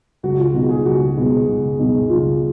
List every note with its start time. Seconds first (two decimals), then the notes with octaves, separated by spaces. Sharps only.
0.23 C#2 F#4
0.39 F4
0.54 B2 G#3 B3 D#4 F#4
0.70 G#4
0.85 C#2 F#4
1.16 B2 G#3 B3 D#4
1.48 C#2
1.79 B2 G#3 B3 D#4
2.09 C#2 F4